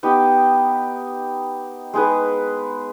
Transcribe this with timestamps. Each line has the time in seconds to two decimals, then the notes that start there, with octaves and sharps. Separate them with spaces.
0.03 B3 D#4 G4
1.93 G#3 D#4 G#4 B4